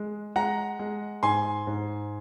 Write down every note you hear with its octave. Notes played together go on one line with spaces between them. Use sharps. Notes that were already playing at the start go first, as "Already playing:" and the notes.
Already playing: G#3
G#3 F#5 A#5
G#3
G#2 G#5 C6
G#2